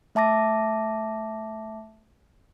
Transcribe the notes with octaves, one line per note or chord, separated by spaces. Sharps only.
A3 E5 A5 D6 A#6